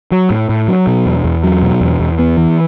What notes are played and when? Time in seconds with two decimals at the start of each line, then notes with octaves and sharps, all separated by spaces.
0.12 F#3
0.30 A2
0.49 A2
0.68 F#3
0.87 B2
1.06 E2
1.24 E2
1.43 F#3
1.62 B2
1.81 E2
2.00 E2
2.19 B3
2.37 E3